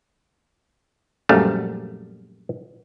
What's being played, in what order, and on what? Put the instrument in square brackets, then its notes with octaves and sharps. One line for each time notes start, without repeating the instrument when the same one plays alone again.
[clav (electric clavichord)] A#1 F#2 G3 A3 F5